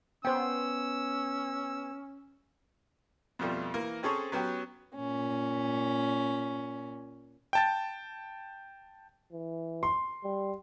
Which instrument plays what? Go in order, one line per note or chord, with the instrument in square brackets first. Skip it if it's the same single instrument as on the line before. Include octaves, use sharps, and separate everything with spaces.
[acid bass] B3 [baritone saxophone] C#4 [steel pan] C5 G5 [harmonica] E6
[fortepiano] F2 B2 F3 G3 A3
E3 A#3 A#4
C4 C#4 G#4 A4 C5 C#5
F#3 B3 C#4 F#4 G4
[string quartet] A#2 C#4
[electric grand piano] G5 A5 A6
[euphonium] E3
[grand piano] C6
[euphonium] G3